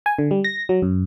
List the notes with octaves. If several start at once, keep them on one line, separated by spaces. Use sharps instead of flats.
G#5
D3
G3
A#6
F#3
F#2